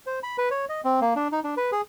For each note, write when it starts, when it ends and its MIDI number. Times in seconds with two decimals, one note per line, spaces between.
0.06 0.19 72
0.23 0.37 83
0.38 0.49 71
0.51 0.65 73
0.69 0.81 75
0.84 1.00 60
1.01 1.14 58
1.16 1.28 62
1.32 1.40 63
1.44 1.55 62
1.57 1.71 71
1.72 1.81 68